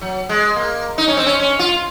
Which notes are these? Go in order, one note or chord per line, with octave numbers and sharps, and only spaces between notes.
F#3
G#3
A#3
D#4
C#4
C4
C#4
C#4
F4